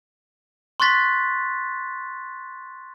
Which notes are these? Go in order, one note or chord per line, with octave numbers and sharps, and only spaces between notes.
C6 C#6 F#6 A6 B6